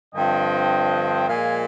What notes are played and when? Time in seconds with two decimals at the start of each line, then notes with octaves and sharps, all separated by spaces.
0.15 G2 D3 F3 C4 D#5 G5
1.28 A#2 F3 G#3 F5 G#5